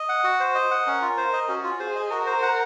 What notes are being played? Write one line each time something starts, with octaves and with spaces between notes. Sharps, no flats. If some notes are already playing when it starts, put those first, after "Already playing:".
Already playing: D#5
F#5
F#4
C5
D#5
F#5
C#4 A#4
F4
C5
D#5
C#4 F#4
F4
G#4 C5
D#5
F#4 A#4
C5
F#5